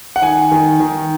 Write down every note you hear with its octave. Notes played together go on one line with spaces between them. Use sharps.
F#5
D#3 G#5
D#3
D#3